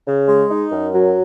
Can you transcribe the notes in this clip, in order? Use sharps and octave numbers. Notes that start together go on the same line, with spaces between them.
C#3
G#3
D#4
F#2
F#3